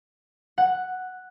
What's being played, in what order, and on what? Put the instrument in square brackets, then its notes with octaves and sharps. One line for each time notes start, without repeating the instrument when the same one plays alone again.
[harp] F#5